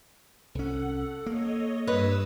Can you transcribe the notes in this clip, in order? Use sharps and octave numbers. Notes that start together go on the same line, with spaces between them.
C2 C#4 A4 F#5
A#3 C#5 D#5
G2 B4 C#5 D#5 D#6 E6